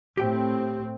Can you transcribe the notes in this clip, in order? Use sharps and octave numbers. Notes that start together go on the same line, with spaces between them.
A2 C4 G4 G5